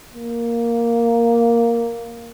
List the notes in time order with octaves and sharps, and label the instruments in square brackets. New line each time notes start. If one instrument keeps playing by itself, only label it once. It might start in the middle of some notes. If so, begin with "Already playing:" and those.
[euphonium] A#3